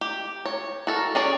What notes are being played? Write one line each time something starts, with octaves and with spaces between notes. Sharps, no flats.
G4
C#5
F#4 A4 A#4
C#4 G#4 D5